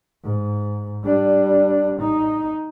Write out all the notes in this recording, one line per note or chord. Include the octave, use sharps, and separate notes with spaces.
G#2
G3 D4
D#4